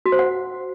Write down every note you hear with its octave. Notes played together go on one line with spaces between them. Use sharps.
F#4
C5
F#5